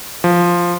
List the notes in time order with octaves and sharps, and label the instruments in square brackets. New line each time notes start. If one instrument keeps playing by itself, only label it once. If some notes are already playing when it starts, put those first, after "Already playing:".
[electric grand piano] F3